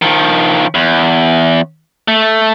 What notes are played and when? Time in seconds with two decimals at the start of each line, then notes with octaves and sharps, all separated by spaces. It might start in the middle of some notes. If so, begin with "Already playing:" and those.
0.02 D#3 F3
0.75 E2
2.08 A3